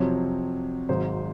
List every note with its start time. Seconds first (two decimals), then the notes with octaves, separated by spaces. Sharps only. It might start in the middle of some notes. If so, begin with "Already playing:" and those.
Already playing: F2 C3 F#3 C#5
0.89 G#1 G#2 F#3 C5